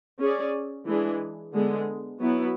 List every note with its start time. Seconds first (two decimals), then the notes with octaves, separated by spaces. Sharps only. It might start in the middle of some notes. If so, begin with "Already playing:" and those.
0.19 C#4 G#4 D5
0.86 E3 G#3 D4 G#4
1.53 D3 G#3 B3
2.19 F#3 B3 E4